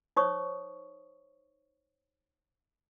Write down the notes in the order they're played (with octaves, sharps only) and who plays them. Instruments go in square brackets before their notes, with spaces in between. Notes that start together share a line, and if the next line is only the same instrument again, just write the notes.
[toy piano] D#4 C5 C#5 C#6 D#6